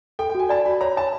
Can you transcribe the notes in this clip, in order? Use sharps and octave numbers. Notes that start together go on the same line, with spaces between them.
A4 G5
G5
F#4 G#5
D5 A5
F#4 B5
C#5 A#5
C#5 A5